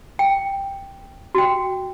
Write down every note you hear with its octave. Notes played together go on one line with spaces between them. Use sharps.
G5
F#4 G5